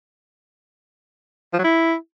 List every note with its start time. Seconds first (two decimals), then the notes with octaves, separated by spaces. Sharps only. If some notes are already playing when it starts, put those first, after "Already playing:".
1.53 F3
1.59 F#3
1.64 E4